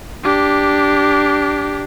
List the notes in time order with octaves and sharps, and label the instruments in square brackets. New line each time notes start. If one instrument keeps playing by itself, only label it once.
[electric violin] D4 G4